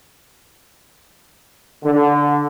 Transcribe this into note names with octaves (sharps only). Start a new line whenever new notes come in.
D3